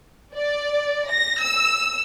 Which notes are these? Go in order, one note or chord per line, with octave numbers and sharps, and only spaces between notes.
D5
A#6
E6